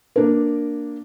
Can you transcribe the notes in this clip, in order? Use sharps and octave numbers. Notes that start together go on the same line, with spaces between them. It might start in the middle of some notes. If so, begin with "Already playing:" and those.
A#3 D4 A#4